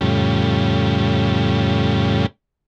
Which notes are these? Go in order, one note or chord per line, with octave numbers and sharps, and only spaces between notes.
F2 A2 C#3 G3